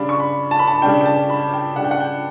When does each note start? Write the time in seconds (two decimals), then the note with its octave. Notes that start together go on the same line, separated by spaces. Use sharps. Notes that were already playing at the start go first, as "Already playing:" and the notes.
Already playing: C#3 G3 D4 B5
0.09 C#6
0.20 B5
0.51 A5
0.59 B5
0.67 A5
0.82 C#3 G3 D4 G5
1.01 G5
1.06 A5
1.29 B5
1.53 G5
1.76 C#3 G3 D4 F#5
1.84 G5
1.91 F#5
2.00 G5